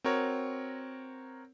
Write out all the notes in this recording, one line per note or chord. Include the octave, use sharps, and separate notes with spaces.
C4 F#4 A#4 C#5